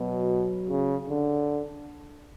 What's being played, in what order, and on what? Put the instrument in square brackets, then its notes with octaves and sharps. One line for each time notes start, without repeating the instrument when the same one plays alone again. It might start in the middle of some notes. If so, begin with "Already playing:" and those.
Already playing: [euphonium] B2 [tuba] F#3
[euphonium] C#3
D3